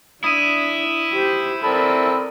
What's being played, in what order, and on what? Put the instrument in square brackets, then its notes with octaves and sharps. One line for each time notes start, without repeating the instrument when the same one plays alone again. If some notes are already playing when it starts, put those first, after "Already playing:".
[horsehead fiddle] D4 [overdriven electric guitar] E4 [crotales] D#6 D#7
[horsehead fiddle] G4 C5
[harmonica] C4 A4 B5 [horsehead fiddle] A#4 D5